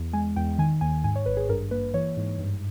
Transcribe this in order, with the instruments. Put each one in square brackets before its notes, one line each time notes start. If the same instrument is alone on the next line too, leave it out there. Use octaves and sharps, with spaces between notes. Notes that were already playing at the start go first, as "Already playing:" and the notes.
Already playing: [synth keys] E2
G#3 G#5
E2 G5
D#3 G#5
D#2 G#5
G#2 G#5
C#5
G#1 B4
G#4
G2 A#4
A#3 B4
E3 C#5
G#2
G2